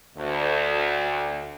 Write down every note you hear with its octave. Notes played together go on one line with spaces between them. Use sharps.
D2